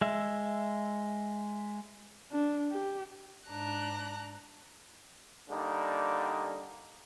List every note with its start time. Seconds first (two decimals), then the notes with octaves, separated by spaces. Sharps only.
0.01 G#3 E5
2.32 D4
2.71 G4
3.49 G#2 D4 A#5 F#6
5.50 D3 G3 A#3 D#4